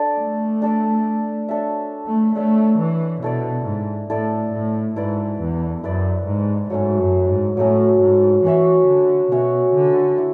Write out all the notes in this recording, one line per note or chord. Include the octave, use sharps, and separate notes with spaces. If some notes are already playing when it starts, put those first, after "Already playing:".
Already playing: D4 A4 D5
A3
D4 A4 D5
D4 A4 C#5 E5
A3
A3 D4 A4 C#5 E5
E3
B2 E4 A4 D5
G#2
A2 E4 A4 D5
A2
G#2 E4 B4 D5
E2
F#2 E4 B4 D5
G#2
G#2 F#3 A3 C#4
F#2
G#2
A2 F#3 A3 C#4
G#2
E3 C#4 F#4 C#5 E5
D3
B2 C#4 F#4 C#5 E5
D3
E4